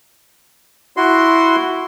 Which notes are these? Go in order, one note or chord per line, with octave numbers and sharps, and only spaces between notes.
E4 F#4 C6